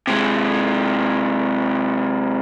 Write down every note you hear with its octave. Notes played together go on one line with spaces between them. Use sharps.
C3 G#3